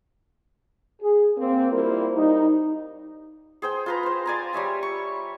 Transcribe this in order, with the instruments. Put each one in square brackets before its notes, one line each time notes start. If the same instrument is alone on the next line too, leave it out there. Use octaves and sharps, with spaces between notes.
[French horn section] G#4
A#3 C4
G3 A#3 E4 F4 A#4 C5
G3 D#4
[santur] G#4 C5 G5
F4 B4 A#5
C5 C6
D5 G#5 A#5
G3 C#5 E5 G#5
C#6